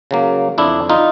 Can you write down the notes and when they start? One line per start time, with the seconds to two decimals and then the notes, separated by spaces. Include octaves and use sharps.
0.11 C#3 F#3 A#3
0.58 F2 D4 E4
0.89 D#4 F4